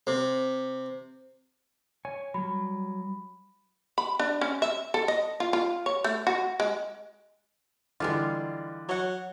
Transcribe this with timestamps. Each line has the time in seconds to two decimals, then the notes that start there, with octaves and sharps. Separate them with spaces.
0.07 C3
2.05 C#5 G#5
2.34 F#3 G3 B5
3.98 B5
4.19 D4
4.41 C#4
4.62 E5
4.94 A4
5.08 D#5
5.40 F4
5.53 F4
5.86 C#5
6.04 A3
6.27 F#4
6.60 G#3
8.00 D3 E3 G3 G#3 B3 F4
8.89 F#3 C#5 F#5